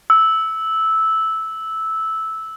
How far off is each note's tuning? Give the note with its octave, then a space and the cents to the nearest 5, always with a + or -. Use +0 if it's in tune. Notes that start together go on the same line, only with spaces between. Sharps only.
E6 -10